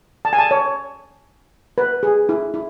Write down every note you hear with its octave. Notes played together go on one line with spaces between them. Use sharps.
A5
G#5
A5
C#5
B4
G#4
E4
E4